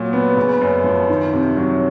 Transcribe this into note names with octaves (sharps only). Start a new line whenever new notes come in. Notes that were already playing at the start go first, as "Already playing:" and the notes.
Already playing: A#2 F#3
B3
C#3
F#2
F3
D#3
C3
F#3